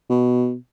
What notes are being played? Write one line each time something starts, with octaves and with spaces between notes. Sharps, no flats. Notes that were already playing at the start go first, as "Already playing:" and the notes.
B2